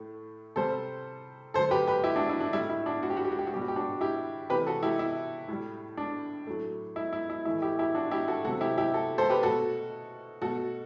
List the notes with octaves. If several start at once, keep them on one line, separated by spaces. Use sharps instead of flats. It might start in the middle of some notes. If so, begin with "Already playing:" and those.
Already playing: A2 A3
C3 G3 A4 C5
D3 F#3 A3 A4 C5
G4 B4
G4 B4
E4 G4
D4 F#4
E4
D4
A2 G3 E4
E4
D4 F#4
F#4
G4
F#4
G4
F#4
G4
F#4
B2 G3 G4
F#4
G4
D4 F#4
E4 G4
C3 E3 A3 G4 B4
F#4 A4
E4 G4
E4
A2 G3
D4
A2 F#3 A3
E4
E4
E4
A2 E3 A3 E4
E4 G4
E4 G4
D4 F#4
E4 G4
F#4 A4
C3 F#3 A3 F#4 A4
E4 G4
E4 G4
F#4 A4
A4 C5
G4 B4
B2 A3 F#4 A4
B2 A3 F#4 A4